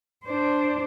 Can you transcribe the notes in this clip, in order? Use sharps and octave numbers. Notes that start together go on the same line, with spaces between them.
D4 C5